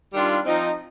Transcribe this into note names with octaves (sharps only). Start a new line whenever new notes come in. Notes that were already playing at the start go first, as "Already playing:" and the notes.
D#3 G3 D4 F4
F3 C4 D#4